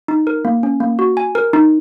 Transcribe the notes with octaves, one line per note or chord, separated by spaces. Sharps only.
D#4
A#4
A#3
C#4
A#3
F#4
G#5
A#4
D#4